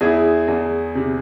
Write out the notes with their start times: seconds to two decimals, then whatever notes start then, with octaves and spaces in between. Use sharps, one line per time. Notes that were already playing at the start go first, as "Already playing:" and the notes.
0.01 E2 E4 G#4
0.48 E2
0.95 C3